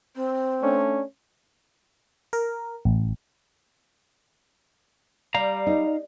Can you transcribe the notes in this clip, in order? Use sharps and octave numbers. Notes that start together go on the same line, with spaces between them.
C4
A3 C#4 D4
A#4
A1
G3 F5 A#5
D#4